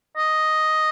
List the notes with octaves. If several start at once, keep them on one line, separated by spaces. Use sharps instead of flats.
D#5